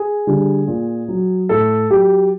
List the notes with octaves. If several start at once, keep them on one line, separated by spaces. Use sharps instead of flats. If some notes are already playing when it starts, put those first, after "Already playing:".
Already playing: G#4
D3 G3
A#2
F#3
A2 A4
F#3 G4